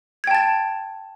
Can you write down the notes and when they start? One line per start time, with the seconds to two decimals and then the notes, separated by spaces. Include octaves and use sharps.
0.24 G#6
0.27 G5
0.31 A5
0.35 A6